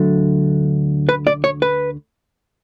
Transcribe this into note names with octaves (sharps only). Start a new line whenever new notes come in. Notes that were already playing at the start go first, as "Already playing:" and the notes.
Already playing: D2 D3 F#3 A3
B4
D5
C#5
B4